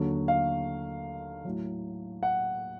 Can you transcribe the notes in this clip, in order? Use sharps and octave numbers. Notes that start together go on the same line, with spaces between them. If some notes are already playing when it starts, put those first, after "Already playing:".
Already playing: D#2 D3 F#3
F5
A2 F#3
F#5